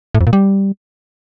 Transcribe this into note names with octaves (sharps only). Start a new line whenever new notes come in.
A2
F2
A#2
G3